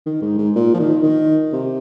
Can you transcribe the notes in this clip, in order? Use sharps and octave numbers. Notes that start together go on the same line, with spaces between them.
D#3
G#2
G#2
A#2
F3
D#3
D#3
C3